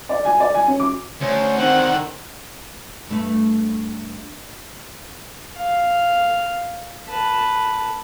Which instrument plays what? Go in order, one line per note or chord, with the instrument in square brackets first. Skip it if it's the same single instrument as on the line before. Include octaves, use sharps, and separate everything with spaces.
[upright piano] D5
G#5
D5
G#5
C#4
D6
[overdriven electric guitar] D2 [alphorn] C#4 [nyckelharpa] C5
[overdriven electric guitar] D3 D#3 [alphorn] C4 [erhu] F#5
[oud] G2 A3 B4
[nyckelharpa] F5
B4 A5